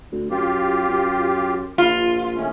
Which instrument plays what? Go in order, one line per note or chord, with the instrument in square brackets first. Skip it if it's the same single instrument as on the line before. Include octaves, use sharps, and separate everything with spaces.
[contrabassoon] D2
[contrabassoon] F#2 [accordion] F4 G4
[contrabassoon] F#2
[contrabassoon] A#1 [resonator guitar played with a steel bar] F4
[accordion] D#3 A3 C#4